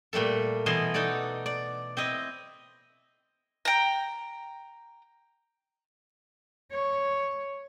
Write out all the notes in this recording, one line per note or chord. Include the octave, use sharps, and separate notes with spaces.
A#2 G3 A3 A4
B2 E3 E4 D#5 C6
D#4 F#4 A4 D5
D5
C4 E4 D#5
G5 A#5
C#5